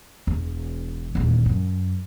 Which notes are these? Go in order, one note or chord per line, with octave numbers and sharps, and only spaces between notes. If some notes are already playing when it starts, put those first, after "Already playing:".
E1
D#1 E2
F#2